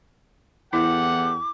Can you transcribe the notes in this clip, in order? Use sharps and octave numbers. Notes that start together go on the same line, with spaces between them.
E2 E4 G4 A4 F#5 D6